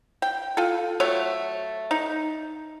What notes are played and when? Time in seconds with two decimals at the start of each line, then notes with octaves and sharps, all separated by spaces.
0.22 G5
0.57 F4 A4
1.00 F#3 A3 C#5
1.91 D#4